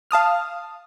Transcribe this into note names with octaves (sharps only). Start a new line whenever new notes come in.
F5 A5 D#6 F6